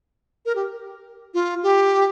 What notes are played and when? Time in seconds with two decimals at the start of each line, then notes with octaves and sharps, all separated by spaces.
0.45 A#4
0.55 G4
1.34 F4
1.63 G4